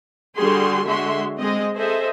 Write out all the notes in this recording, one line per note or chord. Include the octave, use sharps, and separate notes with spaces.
D3 G3 F#4 G#4 C6
D3 G#3 F#4 E5 C6
G#3 C4 D#5
G#4 A4 C5 D#5 E5